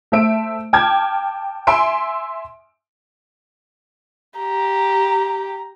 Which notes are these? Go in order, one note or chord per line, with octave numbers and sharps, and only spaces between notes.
A3 C5 E5 D7
G5 A5 D6 F6 G#6
E5 G#5 C6 D7
G4 A#5